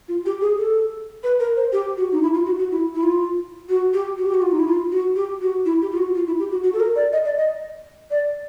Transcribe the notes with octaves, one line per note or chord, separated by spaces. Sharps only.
F4
G4
G#4
A4
B4
A#4
C5
G4
F#4
D#4
E4
F4
F#4
F#4
E4
E4
F4
F#4
G4
F#4
G4
F#4
F4
D#4
E4
F4
F#4
G4
F#4
E4
G4
F4
F#4
F4
E4
G4
F#4
F#4
A4
A#4
D5
D#5
D5
D#5
D5